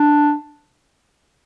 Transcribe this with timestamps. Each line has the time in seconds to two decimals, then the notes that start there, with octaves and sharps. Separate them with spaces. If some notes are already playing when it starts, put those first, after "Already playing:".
Already playing: D4